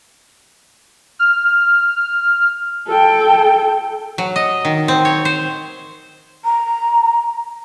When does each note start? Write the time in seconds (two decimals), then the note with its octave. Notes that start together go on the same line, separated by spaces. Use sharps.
1.19 F6
2.87 A4 G5
4.18 F#3
4.36 D#5
4.65 D#3
4.88 C4
5.05 C#5
5.25 C5
6.45 A#5